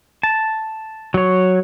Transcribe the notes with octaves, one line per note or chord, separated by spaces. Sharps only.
A5
F#3 C#5